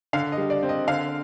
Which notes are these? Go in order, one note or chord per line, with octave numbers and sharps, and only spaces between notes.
D3 F5
D#5
G3
D5
C4
D#5
D3 F5